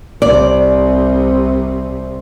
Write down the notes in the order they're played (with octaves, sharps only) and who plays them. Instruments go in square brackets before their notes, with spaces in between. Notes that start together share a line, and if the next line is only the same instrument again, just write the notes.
[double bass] C2 C3 [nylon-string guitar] D5